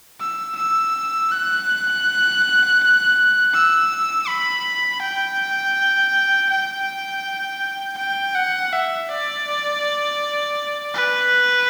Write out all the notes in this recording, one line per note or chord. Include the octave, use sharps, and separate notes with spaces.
E6
E6
F#6
E6
B5
G5
G5
G5
F#5
E5
D5
B4